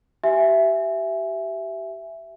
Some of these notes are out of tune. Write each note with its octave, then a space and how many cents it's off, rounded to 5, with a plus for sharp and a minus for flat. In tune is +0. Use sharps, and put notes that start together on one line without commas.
G4 -25 E5 +5 G#5 +0